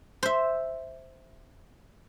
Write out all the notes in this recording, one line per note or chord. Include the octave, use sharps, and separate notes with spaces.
C5 E5